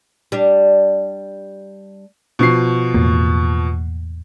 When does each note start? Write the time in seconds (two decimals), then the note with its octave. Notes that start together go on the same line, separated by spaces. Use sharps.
0.32 G3 D4
2.39 B2 F3 C7
2.94 E2 A2 A#3